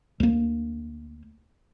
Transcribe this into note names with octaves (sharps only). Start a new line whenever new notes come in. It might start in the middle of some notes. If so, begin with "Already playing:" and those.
D2 A#3